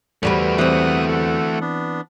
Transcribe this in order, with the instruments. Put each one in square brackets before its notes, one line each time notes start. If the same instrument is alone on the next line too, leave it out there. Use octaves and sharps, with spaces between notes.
[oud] E2 G3 B4 [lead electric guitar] A3 F#4
[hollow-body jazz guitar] E3 C4 [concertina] F#5 D#6 F#6
[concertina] A4 F#5
B3 D4